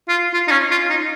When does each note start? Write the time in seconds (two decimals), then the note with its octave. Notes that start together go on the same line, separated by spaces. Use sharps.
0.08 F4
0.34 F4
0.48 D#4
0.52 C#4
0.71 F4
0.89 D#4